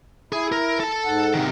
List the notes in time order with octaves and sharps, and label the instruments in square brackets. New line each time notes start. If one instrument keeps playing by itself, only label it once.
[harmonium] E4 [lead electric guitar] G#4
[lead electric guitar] A#4
A4 A5
[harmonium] G#2 F#5
[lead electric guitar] C3 D#3